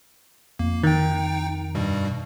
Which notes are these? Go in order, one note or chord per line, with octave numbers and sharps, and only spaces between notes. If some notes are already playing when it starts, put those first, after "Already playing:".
F2 A#3
D#3 D#4 G5
G2 B2 G3